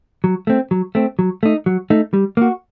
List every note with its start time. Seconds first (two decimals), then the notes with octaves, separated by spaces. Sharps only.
0.24 F#3
0.47 A3 C4
0.71 F#3
0.95 A3 C4
1.19 F#3
1.43 A3 D#4
1.66 F#3
1.90 A3 D#4
2.14 G3
2.37 A#3 F#4